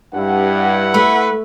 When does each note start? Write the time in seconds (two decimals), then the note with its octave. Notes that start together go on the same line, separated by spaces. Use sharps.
0.14 G2 E4 F#5
0.94 A3 B4